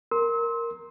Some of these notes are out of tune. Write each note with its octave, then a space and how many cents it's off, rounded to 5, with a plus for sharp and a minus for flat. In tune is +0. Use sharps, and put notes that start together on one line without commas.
A#4 -5 C6 +10 E6 -35